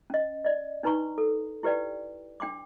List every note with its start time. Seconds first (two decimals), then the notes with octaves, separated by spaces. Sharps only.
0.10 C#4 D#5
0.45 D5 D#5
0.83 D4 D#4 B4 A#5 C6 C#6
1.18 A4
1.63 E4 G4 B4 D5 G5
2.40 D4 G5 C6 D6